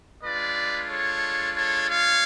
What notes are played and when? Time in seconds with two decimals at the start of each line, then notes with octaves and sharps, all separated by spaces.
0.23 G#3 D4 F4 B4 D5
0.90 A4 C#5
1.56 A4 C#5
1.89 C#5 F5